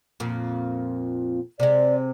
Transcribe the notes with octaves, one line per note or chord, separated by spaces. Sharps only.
F2 A#2
C3 G#3 D5